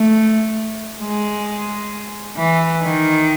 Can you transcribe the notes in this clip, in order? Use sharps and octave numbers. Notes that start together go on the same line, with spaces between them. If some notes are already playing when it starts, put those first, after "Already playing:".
Already playing: A3
G#3
E3
D#3